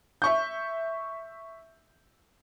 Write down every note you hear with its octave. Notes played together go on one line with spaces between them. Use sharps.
E5 C#6 G6